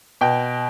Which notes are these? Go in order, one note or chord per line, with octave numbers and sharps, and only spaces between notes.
B2 G5